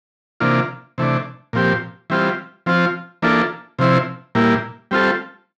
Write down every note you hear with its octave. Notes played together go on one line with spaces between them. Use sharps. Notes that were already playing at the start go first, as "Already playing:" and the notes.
C3 E3 A#3 D4 F4
C3 E3 A3 D4
A#2 F3 C4 G4
E3 G3 C4 F4
F3 C4 F4
E3 A#3 D4 F4 A4
C3 F3 C4 E4
A#2 G3 A#3 E4
G3 C4 F4 A4